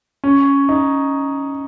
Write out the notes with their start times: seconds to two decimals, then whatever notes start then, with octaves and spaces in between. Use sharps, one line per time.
0.24 C#4
0.69 D#4